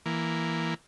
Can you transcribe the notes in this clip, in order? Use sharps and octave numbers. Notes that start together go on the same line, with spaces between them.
E3 A#3